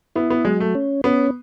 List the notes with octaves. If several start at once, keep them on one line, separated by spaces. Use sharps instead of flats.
B3 E4
B3
F#3 G#3
A3
C#4
B3 C#4